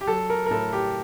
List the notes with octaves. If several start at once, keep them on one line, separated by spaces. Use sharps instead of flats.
G4
F#3 A4
A#4
A#4
A2 A4
G4